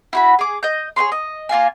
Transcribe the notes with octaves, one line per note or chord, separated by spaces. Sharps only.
E4 F#4 B5
G#4 D6
D#5 G6
G#4 C5 C#5 C6
D#5
A#3 F4 F5 G#5